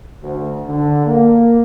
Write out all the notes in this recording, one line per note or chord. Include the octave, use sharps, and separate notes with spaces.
D2
D3
A#3